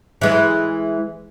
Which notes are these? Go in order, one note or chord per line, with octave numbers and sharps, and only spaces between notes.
E3 G#3